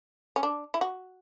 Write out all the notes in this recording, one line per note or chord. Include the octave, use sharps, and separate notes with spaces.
C#4
D4
E4
F#4